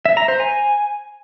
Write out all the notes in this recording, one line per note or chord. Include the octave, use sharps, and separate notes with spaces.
E5
A#5
C5
G#5